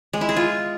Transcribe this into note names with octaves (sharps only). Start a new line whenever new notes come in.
G#3
E4
G#4
F4